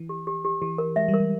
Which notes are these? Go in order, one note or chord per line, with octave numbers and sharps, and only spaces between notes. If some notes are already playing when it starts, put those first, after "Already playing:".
Already playing: E3
G4
G4
G4
E3 G4
A#4
G#3 E5
G3
A#4
G3